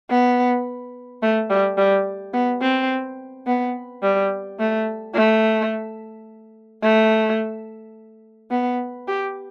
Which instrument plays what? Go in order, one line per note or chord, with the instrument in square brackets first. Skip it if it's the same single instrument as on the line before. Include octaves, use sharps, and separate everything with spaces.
[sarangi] B3
A3
G3
G3
B3
C4
B3
G3
A3
A3
A3
B3
G4